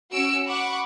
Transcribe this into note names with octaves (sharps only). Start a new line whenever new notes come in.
C#4 F#4 E6 C#7 D7
F#5 B5 C#6 D6 F#6